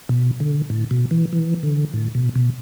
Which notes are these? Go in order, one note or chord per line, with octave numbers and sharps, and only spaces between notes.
B2
D3
A2
B2
E3
E3
D3
A2
B2
B2